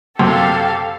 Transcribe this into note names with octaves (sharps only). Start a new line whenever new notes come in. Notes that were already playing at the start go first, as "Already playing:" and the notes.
F#2 C3 G4 A4 F5